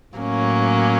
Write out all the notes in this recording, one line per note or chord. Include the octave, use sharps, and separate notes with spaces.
A2 F#3 A#3 C#4